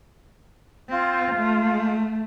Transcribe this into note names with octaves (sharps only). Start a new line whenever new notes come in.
C4 F4
A3